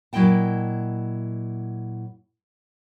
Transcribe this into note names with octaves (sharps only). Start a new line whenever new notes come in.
A#2 F#3 E4 D#5 G5 A5